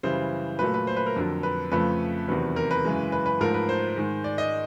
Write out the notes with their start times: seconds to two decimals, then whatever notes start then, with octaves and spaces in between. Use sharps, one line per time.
0.03 F#2 C#3 E3 G3 C5
0.59 A#2 F#3 A3 B4
0.74 B4
0.87 C5
0.97 B4
1.07 A#4
1.16 F2 D3 F#3
1.43 B4
1.71 F2 C#3 F3 A3 B4
2.28 E2 C3 D#3 F#3 B4
2.56 A#4
2.71 B4
2.84 F#2 C#3 E3 G#3
3.12 B4
3.26 B4
3.40 G#2 F3 A3 A#4
3.54 B4
3.69 C5
3.96 G#2 D#3 G#3
4.24 D5
4.38 D#5